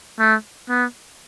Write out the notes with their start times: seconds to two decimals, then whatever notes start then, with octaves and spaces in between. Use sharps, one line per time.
0.19 A3
0.69 B3